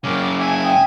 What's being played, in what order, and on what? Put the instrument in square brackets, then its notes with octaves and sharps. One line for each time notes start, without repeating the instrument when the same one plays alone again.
[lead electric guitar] F#2 C#3 [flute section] F#5 D6 F6
[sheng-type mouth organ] E5 G#5 [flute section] A5
[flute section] G5 D#6